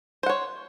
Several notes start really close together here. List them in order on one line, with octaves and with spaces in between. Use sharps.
C5 F#5 C#5